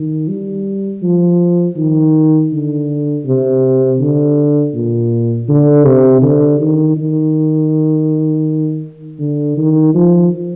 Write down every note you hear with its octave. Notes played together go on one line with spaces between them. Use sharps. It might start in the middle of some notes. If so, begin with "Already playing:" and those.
Already playing: D#3
G3
F3
D#3
D3
C3
D3
A#2
D3
C3
D3
D#3
D#3
D3
D#3
F3